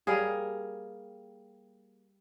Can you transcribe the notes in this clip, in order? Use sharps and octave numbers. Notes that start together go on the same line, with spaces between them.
G3 A#3 G#4